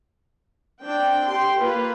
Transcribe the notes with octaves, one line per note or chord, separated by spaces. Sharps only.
C4 D4 G5
G4 G5 C6
A#3 F4 B4